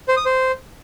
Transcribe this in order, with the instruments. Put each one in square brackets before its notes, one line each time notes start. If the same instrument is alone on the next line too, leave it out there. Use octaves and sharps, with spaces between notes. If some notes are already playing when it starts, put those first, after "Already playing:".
[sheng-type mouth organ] C5
D#6
C5